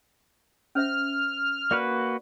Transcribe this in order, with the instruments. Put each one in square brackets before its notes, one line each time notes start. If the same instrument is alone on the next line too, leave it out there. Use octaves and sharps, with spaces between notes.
[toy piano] C#4 C5 E5 [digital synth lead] F6
[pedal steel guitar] A#3 F#4 B4 [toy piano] D5